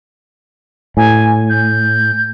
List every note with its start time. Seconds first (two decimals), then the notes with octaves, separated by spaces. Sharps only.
0.97 A2 G#5
1.49 G6